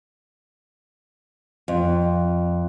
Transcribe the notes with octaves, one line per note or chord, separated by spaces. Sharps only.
F2